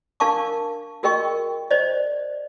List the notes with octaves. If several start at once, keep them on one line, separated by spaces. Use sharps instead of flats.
D4 A#4 F5 A5 C#6 D6
F#4 G#4 A#4 D#5 G5 C#6
C5 D5 D#5